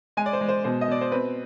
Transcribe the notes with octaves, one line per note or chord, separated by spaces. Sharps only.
G#3 G#5
D5
C5
G#3
C5
B2 C5
D#5
B2 D5
C5
C4 B4